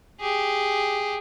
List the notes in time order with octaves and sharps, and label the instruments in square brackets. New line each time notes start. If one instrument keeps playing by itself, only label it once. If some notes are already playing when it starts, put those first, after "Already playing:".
[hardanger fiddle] G4 G#4